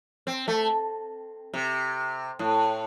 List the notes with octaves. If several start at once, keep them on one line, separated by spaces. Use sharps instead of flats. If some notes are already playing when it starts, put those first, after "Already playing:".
C4
A3
C3
A2